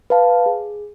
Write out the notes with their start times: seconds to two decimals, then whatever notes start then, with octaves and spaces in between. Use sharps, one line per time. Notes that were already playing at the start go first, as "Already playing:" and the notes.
0.10 B4 F5 A5
0.46 G#4